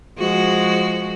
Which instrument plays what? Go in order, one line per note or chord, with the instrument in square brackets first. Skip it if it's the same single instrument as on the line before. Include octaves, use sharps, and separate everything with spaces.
[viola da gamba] F3 G#3 F#4